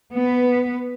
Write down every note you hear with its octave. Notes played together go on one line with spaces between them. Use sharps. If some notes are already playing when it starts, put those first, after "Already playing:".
B3 B4